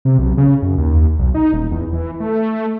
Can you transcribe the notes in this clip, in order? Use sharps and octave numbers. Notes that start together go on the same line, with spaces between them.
C3
B1
C#3
F#2
D#2
B1
D#4
D#1
E2
E3
A3